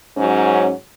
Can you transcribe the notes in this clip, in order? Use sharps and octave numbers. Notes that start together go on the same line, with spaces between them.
G#2 F#3 C#4